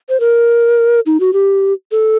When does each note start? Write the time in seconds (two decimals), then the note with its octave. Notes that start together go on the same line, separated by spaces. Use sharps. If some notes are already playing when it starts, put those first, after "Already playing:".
0.09 C5
0.20 A#4
1.06 D#4
1.20 F#4
1.33 G4
1.91 A4